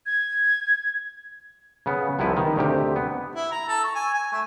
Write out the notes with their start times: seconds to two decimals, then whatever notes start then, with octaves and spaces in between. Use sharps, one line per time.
0.06 G#6
1.86 C#3 B3
2.19 C2 C3 F3 B3 E4 B4
2.36 D#3
2.56 D2 C3 G4
2.96 B3
3.36 E4
3.52 A#5
3.68 A4
3.84 C#6
3.95 G#5
4.14 G#5
4.32 A3